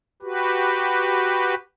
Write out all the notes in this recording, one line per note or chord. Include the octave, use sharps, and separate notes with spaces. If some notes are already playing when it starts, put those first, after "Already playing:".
F#4 G4 B4